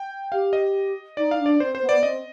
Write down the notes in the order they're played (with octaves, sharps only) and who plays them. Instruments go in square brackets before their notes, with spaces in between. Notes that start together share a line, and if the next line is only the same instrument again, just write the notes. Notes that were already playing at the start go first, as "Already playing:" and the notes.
Already playing: [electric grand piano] G5
[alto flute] G4 [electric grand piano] F5
[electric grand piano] D#5
[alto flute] D#4 [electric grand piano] D5
[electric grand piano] F5
[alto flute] D4
[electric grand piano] D5
[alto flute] C4 [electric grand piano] C5
[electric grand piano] C5
[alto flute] B3
[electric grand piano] D5
[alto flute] C4 [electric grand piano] D#5